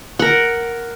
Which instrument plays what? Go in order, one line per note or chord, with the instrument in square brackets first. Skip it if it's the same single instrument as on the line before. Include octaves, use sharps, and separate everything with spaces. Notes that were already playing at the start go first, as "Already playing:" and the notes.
[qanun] A#4 F#5